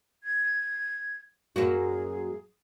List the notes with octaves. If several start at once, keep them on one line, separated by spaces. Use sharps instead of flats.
G#6
F#2 A#3 F#4 G#4